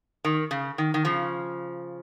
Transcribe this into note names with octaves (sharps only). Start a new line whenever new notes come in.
D#3
C#3
D#3
D#3
C#3 F3